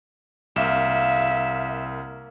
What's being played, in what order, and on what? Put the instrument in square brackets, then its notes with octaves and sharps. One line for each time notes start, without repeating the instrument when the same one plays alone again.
[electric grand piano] C2 E7 [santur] A#3 F5 [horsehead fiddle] E5